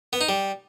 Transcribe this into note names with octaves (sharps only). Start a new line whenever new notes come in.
B3
D#4
G3